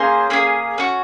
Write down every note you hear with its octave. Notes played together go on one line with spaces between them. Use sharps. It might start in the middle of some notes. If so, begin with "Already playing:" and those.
Already playing: A#3 C#4 G#4 C5
A#3 C#4 G#4
C#4 F#4